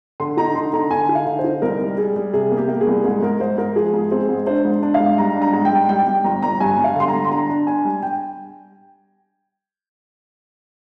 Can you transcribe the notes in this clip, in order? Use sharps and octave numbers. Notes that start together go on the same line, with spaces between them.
D3 C6
D#4 A#5
D3 C6
D3 A#5
D3 G#5
D#4
F5
D3
C5
D#4
C2 A#4
G3
G3 G#4
G3
C3 G#4
A#3
G4
A#3
G#4
C2
G#2 G#4
G#2 A#4
G#2 C5
G#2 A#4
F3 G#4
G#2
C4 G#4
G#2
D4 C5
G#2
D4
F5
G#2
G3 A#5
D4
A#5
G#2
G5
G3
G3 G5
G3 G5
G1 A#5
G1 A#5
G2 G#5
G3
F5
D3 C6
A#5
G3
C6
D4 A#5
D4
D4 G#5
G3
G5